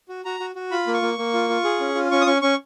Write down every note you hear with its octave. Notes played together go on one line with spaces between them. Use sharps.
F#4
F#4 A#5
F#4
F#4
F4 B5
A#3
C#6
A#3
A#3
F4
F4
G#4
C#4
F4
C#4 C#6
D#6
C#4 C#6
C#4 C#6